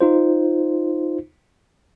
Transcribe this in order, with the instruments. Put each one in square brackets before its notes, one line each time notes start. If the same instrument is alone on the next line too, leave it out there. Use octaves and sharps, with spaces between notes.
[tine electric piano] D#4 F4 C5